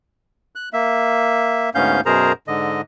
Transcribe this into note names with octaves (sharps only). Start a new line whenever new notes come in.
F#6
A#3 E5
D2 G#2 B3 C#4 F5 G6
F#2 B2 G#4 A#4 C5 A#5
G#2 D3 D#5